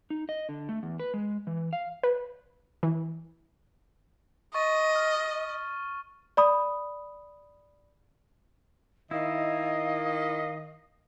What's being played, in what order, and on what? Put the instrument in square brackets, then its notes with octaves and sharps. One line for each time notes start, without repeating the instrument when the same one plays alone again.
[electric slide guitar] D#4
D#5
D3
A3
E2
B4
G#3
E3
F5
[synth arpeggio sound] B4
E3
[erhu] D#5 [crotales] C#6 A6 D#7
[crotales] F6
[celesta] D5 B5 D#6
[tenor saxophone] D#3 [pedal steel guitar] E4 [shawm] D#5 [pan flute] F5